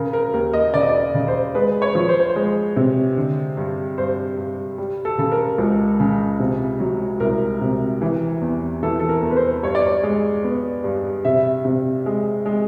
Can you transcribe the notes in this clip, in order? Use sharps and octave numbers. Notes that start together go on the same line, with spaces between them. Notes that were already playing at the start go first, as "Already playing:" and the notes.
Already playing: C#3 A#4
A#4
D#2 A#4
D#5
C#3 D5
D#5
D5
C#3
C5
G#3 B4
C#5
F3
C5
C#5
C5
G#3
C3
D3
G2
G2 C5
G2
G3
A4
C#3 A4
A#4
C#2
C#3
C3
F#3
C2 A#4
C3
E3
E2
E3 A4
A4
A#4
E2
B4
C5
G2 C#5
D5
C#5
G#3
B3
G2
C3 E5
C3
G#3
G#3